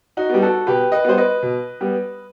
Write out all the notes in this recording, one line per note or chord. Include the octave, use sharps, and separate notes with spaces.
D#4 F#4
G3 B3
F#4 A4
B2 G4 B4
B4 D#5
G3 B3 C5
B4 D#5
B2
G3 B3